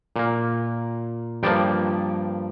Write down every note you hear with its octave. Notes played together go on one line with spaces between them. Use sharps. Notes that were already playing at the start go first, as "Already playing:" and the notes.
A#2 A#3
G2 F3 A#3 D5 G5